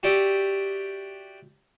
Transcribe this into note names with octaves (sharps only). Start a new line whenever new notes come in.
F#4 G4 D5 E5 G5 D#6